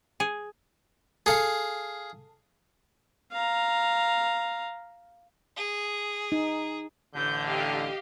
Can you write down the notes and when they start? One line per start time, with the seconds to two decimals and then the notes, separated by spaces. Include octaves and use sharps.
0.20 G#4
1.26 G#4 A4 F5
3.32 F5 A#5
5.56 G#4
6.32 D#4
7.15 A1 D3 G6
7.45 G4 D#5 F5